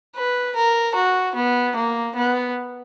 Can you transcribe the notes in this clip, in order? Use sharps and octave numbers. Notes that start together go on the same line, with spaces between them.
B4
A#4
F#4
B3
A#3
B3